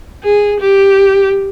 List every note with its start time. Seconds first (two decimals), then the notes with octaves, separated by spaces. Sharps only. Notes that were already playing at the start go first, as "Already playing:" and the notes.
0.23 G#4
0.60 G4